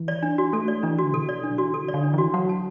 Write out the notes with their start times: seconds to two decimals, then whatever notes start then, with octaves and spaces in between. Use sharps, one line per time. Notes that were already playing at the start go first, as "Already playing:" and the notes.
Already playing: E3
0.08 D5
0.23 D4
0.38 F#4
0.53 A3 A4
0.68 D5
0.83 E3 D4
0.99 D3 F#4
1.14 B2 A4
1.29 D5
1.43 D4
1.51 F#3
1.58 E3 F#4
1.74 D3 A4
1.88 D5
1.94 D3
2.04 D4
2.14 E3 F#4
2.34 F#3 F#5
2.49 A5